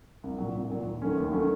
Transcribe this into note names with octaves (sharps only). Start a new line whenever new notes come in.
C2
A#2 F#3
C2
A#2 F#3
D#2
D#3 F#3 A3 C#4
D#2
D#3 F#3 A3 C#4